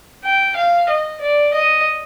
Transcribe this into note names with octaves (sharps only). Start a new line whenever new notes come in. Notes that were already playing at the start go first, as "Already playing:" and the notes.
G5
F5
D#5
D5
D#5